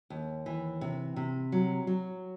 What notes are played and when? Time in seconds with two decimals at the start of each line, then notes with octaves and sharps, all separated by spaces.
0.10 D#2
0.46 E3
0.81 C3
1.16 C3
1.52 F#3
1.87 F#3